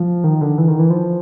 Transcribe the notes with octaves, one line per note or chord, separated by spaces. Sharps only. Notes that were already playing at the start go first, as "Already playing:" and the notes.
Already playing: F3
D#3
D3
E3
D#3
E3
F3